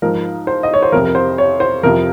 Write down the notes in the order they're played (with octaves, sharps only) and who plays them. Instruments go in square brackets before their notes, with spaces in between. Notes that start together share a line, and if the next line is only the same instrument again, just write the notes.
[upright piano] G#2 F3 A#4
C5
D#5
C#5
C5
F2 C3 F3 A#4
A#4
C5
C#5
C5
F2 C3 F3 A#4